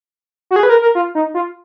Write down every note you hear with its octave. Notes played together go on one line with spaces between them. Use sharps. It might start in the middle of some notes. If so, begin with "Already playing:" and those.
F#4
G#4
B4
A#4
A#4
F4
D#4
F4